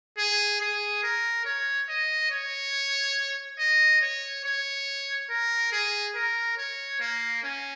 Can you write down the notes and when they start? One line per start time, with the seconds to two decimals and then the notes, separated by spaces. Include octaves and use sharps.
0.17 G#4
0.60 G#4
1.03 A#4
1.45 C#5
1.89 D#5
2.31 C#5
3.59 D#5
4.01 C#5
4.45 C#5
5.30 A#4
5.72 G#4
6.15 A#4
6.57 C#5
7.00 A#3
7.43 C#4